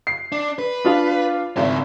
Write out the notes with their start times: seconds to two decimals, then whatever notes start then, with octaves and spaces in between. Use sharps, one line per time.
0.07 C7
0.32 D4
0.59 B4
0.85 D4 F4 F5
1.57 G#1 C#3 E4